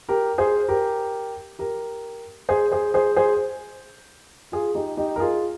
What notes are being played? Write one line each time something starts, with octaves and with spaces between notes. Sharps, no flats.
G4 A#4
G#4 C5
G4 A#4
G4 A#4
G#4 C5
G#4 C5
G#4 C5
G#4 C5
F4 G#4
D#4 G4
D#4 G4
A#4
F4 G#4